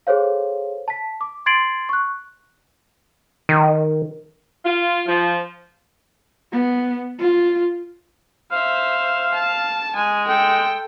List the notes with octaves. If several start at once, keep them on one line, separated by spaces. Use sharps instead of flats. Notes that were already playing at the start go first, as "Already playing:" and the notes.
G#4 A4 C5 C#5 F5
A5 B6
D6
C6 G#6 A6 C7 D7 F#7
C#6 F#6
D#3
F4
F3
B3
F4
C5 E5 F5
A5
G#3 G#5
A4 G5